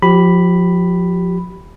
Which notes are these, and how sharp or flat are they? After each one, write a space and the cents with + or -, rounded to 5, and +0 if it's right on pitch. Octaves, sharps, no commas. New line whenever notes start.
F3 +25 G4 -15 B5 +0